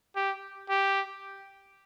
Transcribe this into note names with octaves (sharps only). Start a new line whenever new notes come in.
G4
G4